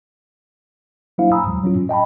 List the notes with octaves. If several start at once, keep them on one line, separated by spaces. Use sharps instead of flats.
F#3 A#3 D4 E4 C5 F5
G#5 A#5 B5 D#6 E6
D#2 A2 F#3 G#3
F#3 C#4 F4
A2 C#4
D#5 G5 A5 B5